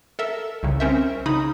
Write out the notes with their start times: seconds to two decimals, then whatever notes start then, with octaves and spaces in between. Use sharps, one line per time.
0.19 A4 A#4 E5
0.63 C2 C#3
0.80 C4 C#4 A#4 C5 E5
1.26 C#3 D#4 B5 D#6